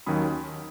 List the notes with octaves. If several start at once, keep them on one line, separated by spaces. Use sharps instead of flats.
D#2 D#3 F#3 C#4 B5 D#6